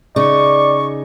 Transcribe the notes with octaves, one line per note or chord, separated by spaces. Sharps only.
C#3 D#4 D5 C#6